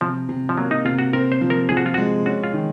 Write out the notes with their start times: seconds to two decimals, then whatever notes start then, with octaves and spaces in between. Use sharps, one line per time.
0.01 C3 F3
0.29 C3
0.49 F3
0.57 F#3 A#3
0.71 D#4
0.85 C3 F4
0.99 F#4
1.13 C4 A#4
1.32 C5
1.41 F3
1.50 A#4
1.69 F3 G#4
1.77 F#4
1.86 F4
1.94 G#3 F#4
2.26 C#4 F#4
2.44 F4
2.53 D#3